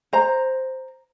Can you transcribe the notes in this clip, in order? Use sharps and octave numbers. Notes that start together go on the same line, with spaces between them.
C5 A#5